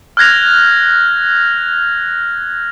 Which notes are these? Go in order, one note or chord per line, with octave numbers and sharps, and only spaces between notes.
F6 F#6 G#6 A#6 F7